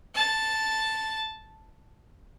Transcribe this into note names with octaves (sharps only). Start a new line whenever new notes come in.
A5